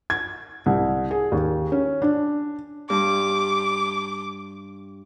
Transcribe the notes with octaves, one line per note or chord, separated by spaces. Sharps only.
G#6
C2
G#4
D#2
C#4
D4
G2 D6